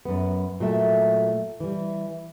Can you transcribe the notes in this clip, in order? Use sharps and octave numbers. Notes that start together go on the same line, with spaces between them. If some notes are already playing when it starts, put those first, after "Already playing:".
F#2 B3
A#2 F#3 A3 E5
E3 G3